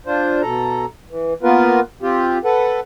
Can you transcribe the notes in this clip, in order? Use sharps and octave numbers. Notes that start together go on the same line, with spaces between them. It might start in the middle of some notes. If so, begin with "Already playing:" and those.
D4 F4 C5
B2 A4 A#5
E3
A#3 B3 F4 A#4 B4
C4 F4 G4
A4 B4 F#5